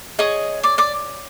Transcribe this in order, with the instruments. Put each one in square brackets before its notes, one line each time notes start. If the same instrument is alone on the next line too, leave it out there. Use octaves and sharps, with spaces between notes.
[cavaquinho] G#4 C#5 D#5 D#6
D5 D6
D5 D6